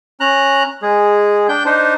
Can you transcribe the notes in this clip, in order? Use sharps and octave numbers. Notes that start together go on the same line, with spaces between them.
C#4 A#5 F#6
G#3 G#4
D4 G5 G6
D4 D#4 C5